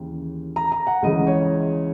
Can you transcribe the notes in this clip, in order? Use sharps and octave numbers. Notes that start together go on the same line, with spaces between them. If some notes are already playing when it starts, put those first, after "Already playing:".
Already playing: D#2 C#3 E3
A#5
A#5
F#5
C#2 C#3 E3 D#5
C#5